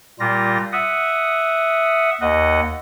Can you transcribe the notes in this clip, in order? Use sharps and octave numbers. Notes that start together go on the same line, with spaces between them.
A#2 G3 F4 A#6
E5 F#5 D#6
D#2 D#5 F#5